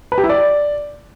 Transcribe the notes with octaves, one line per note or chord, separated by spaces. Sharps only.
B4
G4
E4
D5